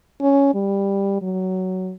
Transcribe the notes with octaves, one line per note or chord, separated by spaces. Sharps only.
C#4
G3
F#3